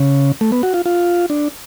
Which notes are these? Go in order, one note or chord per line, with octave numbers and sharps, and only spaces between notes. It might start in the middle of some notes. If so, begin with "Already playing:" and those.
Already playing: C#3
A3
B3
F#4
F4
F4
D4